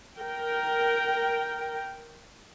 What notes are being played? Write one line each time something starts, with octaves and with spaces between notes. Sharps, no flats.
A#4 G5